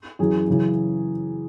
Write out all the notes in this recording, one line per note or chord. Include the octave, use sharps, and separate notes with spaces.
F#2 E3 G#4
F#2 C#3 E3